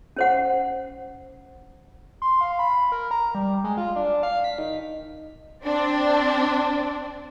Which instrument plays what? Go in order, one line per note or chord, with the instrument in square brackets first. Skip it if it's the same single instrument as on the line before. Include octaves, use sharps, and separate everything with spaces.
[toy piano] C#4 C5 F#5
[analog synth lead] C6
F5
B5
A#4
A#5
G3
G#3
F4
D4
F5
B6
D#3
[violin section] C4 D4 D5